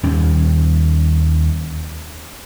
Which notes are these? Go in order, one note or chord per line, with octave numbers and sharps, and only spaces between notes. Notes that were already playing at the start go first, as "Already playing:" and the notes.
D#2 G3 C#4